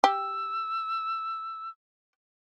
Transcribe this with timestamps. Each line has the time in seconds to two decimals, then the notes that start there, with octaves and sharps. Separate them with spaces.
0.04 G4 E6